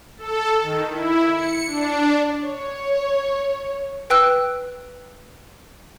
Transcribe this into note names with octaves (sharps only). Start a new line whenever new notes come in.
A4
D#3
E4
C#7
D4
C#5
B4 G5 E6 F#6